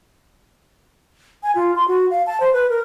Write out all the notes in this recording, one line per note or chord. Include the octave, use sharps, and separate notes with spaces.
G#5
F4
C6
F#4
F5
A5
C5
B4
A#4